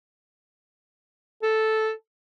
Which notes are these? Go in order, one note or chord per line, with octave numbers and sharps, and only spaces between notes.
A4